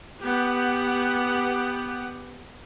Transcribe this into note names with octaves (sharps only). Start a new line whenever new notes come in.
B3 G4 F#5